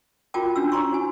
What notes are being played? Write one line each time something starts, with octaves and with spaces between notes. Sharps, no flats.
F4 F#4 A#4 G5 A5 D6
C#4 D4 F#4 E6
E4 C5 A#5 C6 C#6
F#4 G#5